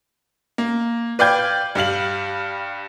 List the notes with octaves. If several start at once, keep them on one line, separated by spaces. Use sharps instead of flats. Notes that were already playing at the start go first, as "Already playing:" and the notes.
A#3
B4 D5 F5 G5 G6 G#6
G2 G3 F5 F#7